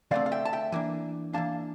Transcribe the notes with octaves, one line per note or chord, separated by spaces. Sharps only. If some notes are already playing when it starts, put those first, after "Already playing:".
D3 A3 C4 D5 F5
F5
E5 G5
A5
E5 G5
E3 A#3 D4
E3 A#3 D4 F5 A5